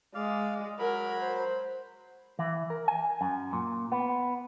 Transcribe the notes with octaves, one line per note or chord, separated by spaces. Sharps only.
G#3 D5 F5
F#3 A#4 B5
C5
E3
A#4
G#5
F#2
A#2
B3